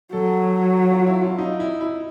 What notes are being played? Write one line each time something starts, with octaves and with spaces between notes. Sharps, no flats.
F#3 A4
F4
E4
F4
D#4
E4
E4